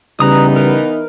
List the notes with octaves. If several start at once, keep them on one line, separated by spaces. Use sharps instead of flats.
C#3 E3 G3 B3 D#4 B4 A#5 D#6
A#4 B4